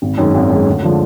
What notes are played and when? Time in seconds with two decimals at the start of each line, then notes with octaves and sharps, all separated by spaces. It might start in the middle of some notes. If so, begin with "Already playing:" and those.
0.02 G#1
0.18 F#2 D#3 G#3
0.34 G#1
0.50 F#2 D#3 G#3
0.67 D2
0.83 D3 F3 G#3